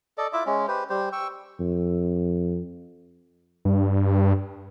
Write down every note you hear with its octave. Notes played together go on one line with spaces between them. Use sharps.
A4 D5 D#5
E4 F4 E5 D6
G#3 C#4
G4 B4 C5
G3 G4 C5
G5 C#6 E6
F2
G2